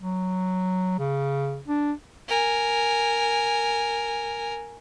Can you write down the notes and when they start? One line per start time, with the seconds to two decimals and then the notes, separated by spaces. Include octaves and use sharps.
0.01 F#3
0.99 C#3
1.68 D4
2.28 A#4 G#5